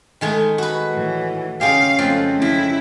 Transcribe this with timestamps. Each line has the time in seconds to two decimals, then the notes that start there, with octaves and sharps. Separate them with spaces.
0.21 D#3 G#3 A3
0.58 F#4 B4
0.94 A2 E3
1.61 C#3 G#3 G4 F5
1.99 F2 F3 A3 C4
2.42 F2 E4